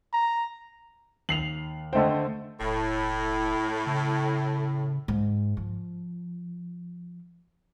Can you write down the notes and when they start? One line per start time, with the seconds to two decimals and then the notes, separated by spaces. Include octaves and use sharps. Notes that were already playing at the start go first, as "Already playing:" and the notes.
0.13 A#5
1.29 D#2 C7 F7 F#7
1.93 D3 A3 C5 D#5 G5
2.60 E1 A2
3.86 C#3
5.08 G#2
5.57 F3